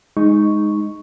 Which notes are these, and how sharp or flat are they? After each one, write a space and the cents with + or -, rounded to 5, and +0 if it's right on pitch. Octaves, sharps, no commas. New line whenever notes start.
G#3 +0 D#4 +0 C#6 +0